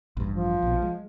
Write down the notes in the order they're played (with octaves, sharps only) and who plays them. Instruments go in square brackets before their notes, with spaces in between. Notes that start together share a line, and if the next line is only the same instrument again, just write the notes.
[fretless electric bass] A1 G2
[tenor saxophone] F3
[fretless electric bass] A#1 B2
G#3